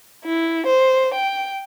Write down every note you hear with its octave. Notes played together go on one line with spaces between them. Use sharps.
E4
C5
G5